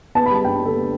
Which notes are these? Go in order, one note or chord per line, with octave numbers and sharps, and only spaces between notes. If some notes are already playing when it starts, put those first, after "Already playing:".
B3 A5
B5
G3 A5
G2 G5
D3 A4
B3